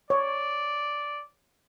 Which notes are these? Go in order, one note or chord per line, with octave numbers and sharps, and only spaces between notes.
C#5 D5